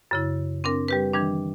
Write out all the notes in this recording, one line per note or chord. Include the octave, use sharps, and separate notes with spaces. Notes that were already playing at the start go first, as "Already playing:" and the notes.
F#2 C#3 E4
C4 D4 A#4
G3 G4 B4
D#3 E3 G3 D4